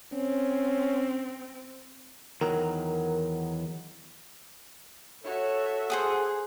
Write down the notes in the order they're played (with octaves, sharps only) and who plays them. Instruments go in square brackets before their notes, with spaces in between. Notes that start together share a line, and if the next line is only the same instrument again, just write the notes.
[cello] C4 [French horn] C#4
[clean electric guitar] E2 D#3 F#3 [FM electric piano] A#4
[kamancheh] F#4 E5 [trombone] A4 [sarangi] C#5
[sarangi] G#4 [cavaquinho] C5 F#5 D#6